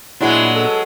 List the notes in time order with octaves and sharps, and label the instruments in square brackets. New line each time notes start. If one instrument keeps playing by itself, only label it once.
[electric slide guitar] A#2 D4 [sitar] F#3 G#3 B3 [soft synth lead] E4
[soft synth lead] A4